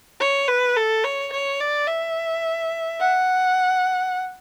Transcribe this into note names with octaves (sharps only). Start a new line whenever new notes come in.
C#5
B4
A4
C#5
C#5
D5
E5
F#5